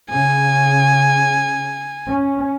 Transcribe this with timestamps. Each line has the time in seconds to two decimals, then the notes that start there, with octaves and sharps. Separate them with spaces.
0.10 C#3 G#5
2.09 C#4